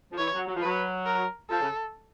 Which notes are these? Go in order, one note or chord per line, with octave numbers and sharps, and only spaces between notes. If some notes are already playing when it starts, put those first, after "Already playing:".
F3
E3 C#5
F#3
F#3
F3
F#3 B4
A#4
F3 A4
C#3